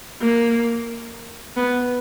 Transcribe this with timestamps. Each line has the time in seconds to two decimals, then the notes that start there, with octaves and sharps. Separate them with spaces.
0.21 A#3
1.57 B3